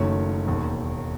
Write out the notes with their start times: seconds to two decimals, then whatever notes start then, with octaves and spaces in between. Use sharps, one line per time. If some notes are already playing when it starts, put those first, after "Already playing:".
Already playing: F#1 F#2 D#3 A3 C#5
0.47 E1 D#2 D#3